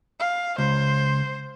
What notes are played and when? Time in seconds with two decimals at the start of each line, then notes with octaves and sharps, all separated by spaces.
0.20 F5
0.58 C#2 C5